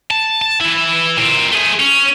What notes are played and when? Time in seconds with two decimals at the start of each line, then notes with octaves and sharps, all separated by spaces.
0.11 A5
0.42 A5
0.61 E3 E4
1.17 A#2 C4
1.51 A3 G#4
1.79 C#4